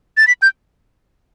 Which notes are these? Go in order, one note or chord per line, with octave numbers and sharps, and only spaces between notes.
A6
B6
G6